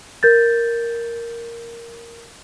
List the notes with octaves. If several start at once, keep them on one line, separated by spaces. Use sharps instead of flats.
A#4 G6 A6